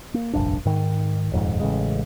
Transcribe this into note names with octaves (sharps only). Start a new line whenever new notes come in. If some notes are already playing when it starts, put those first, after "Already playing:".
A#3
F1 A#1 G2 D4
G#2 D#3
D#1 F2 G#2
A1 C#3 G#3